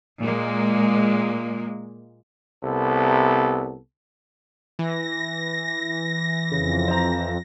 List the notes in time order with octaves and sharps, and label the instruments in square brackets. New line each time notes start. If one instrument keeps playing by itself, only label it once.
[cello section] A#2 G#3 A#3
[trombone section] C2 C3 B3 A4
[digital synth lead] E3 [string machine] A#6
[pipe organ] F2 [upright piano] C#3
[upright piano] C5 A#5